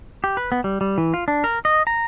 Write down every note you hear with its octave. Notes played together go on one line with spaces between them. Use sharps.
G4
B4
B3
G3
G3
E3
F4
D4
A#4
D#5
A#5